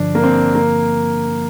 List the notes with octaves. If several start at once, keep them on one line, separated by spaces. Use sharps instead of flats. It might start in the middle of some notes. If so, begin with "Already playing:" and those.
Already playing: G2 D3 F3 D4
A#3
C4
A#3